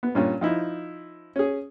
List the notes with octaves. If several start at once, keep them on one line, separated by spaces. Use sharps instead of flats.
B3
G2 A#2 C#4
F3 D#4 E4
C#4 G#4